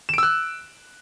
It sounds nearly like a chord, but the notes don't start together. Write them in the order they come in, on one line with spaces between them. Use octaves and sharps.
E7 D7 E6 F#6